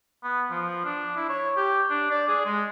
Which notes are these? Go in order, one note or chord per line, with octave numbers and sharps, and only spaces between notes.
B3
F3
D4
E4
C#5
G4
D4
D5
G#4
G#3